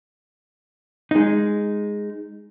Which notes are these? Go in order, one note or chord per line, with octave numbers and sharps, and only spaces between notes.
G#3 D#4